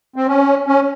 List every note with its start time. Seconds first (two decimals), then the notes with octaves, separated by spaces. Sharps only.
0.16 C4
0.27 C#4
0.66 C#4